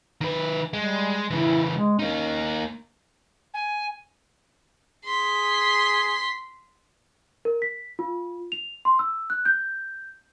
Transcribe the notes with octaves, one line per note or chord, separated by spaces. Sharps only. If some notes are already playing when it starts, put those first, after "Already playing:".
D#3 B4
G3 G#3
C#3 E3 E4
G#3
A#3 C#4 D#4
G#5
G#4 C6 B6
A#4
B6
F4
F7
C6
E6
F#6
G6